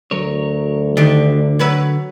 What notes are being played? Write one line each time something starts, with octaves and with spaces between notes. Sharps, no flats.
D2 F#3 A#4 C#5
D3 D#3 D4 G4
F#3 B4 C#5